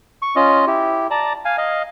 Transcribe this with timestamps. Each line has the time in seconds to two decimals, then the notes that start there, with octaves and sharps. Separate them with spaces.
0.22 C#6
0.36 C#4 F4 D#5
0.67 E4 G4
1.11 D5 A5 A#5
1.45 F5 G#5
1.58 D#5 F5